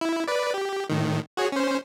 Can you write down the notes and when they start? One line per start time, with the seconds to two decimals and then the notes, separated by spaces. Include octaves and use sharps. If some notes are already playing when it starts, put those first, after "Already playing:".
0.01 E4
0.27 B4 D5
0.54 G4
0.90 A2 D#3
1.37 F#4 G#4 C#5
1.52 C#4 C5